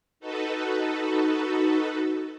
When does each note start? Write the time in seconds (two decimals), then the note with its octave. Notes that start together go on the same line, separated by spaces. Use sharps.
0.20 D#4 F#4 A4 B4